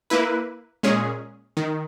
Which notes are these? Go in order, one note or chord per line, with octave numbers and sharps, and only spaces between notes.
A#3 E4 B4
A#2 G#3 C#4 G#4
D#3